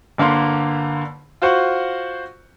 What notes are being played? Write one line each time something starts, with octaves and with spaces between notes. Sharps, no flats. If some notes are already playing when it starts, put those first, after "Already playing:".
G1 D3 A#3 F5 C6
F4 F#4 C5 F#5 C#6